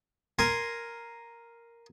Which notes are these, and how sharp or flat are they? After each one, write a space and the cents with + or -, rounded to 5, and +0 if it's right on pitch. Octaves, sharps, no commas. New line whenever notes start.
A#4 +0 G#5 +0 C6 +0